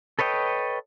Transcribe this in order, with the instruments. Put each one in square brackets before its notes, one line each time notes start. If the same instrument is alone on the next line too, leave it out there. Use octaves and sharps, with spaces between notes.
[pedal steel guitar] A4 B4 C#5 D#5 G5